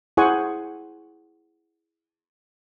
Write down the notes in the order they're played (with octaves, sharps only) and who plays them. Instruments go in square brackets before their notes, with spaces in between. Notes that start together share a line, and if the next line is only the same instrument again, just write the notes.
[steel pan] E4 G#4 C5 F#5 G#5 C#6